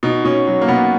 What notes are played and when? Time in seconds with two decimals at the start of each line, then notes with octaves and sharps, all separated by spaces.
0.03 B2 D#4
0.25 B2 C#4
0.47 F#3
0.62 A#3
0.68 B2 B3